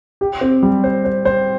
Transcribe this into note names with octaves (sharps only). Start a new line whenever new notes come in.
G4
C4
G3
C5
C5
C5